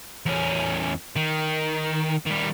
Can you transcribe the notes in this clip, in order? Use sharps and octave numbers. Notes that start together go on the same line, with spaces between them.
E2 C#4
D#3
D#3 G3